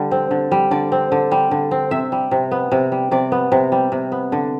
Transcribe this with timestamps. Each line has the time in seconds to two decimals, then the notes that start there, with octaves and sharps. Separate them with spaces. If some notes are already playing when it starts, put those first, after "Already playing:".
Already playing: D3 G3
0.11 C4
0.31 D3
0.51 G3
0.71 D3 D5
0.92 C4
1.12 D3
1.31 G3
1.51 D3
1.71 C4
1.91 C3 E5
2.12 G3
2.31 C3
2.51 B3
2.72 C3
2.92 G3
3.11 C3 D5
3.32 B3
3.52 C3
3.72 G3
3.92 C3
4.12 B3
4.32 D3